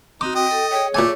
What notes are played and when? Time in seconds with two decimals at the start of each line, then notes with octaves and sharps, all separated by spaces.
0.21 C4 D#4 F#4 D6
0.35 D#5 G5
0.51 A4
0.71 G#4 C#5 G5
0.94 A#2 A3 G#5 D6